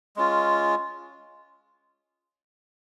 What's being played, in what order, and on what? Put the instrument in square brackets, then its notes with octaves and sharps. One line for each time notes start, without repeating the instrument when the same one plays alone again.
[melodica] G#3 C#4 F4